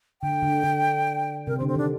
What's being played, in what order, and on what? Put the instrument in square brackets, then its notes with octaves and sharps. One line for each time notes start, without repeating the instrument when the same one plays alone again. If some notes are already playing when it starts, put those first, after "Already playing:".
[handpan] D3 [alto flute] G5
[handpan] D3
D3
[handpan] C3 [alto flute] A#4
[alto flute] C4
[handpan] D3
[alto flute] C4
[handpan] D#3 [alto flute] D4